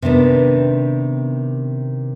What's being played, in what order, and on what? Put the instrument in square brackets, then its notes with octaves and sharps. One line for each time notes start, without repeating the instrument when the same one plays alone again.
[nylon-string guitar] C3 D#3 B3 D4